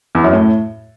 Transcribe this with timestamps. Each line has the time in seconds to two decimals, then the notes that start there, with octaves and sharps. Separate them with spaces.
0.15 E2
0.24 F#2
0.33 A2